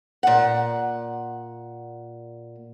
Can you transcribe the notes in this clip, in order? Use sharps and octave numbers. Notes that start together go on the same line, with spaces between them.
A#2 F#5